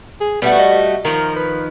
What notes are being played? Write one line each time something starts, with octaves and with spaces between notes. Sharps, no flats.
G#4
G3 A3 B3 F#4
D#5
D#3 F3 A#4
B4